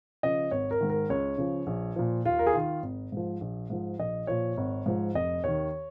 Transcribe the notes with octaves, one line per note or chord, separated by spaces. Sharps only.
C#3 F3 D#5
G#1 C#5
A#4
G#2 D#3
A#4
C#2 C#5
C#3 F3
A#1
A#2 F3
D#2 F4
A#4
G#4
D#3 F4
G#1
G#2 F3
A#1
G#2 F3
A#1 D#5
A#2 F3 C#5
G#1
G#2 F3
F1 D#5
D#2 D#3 C#5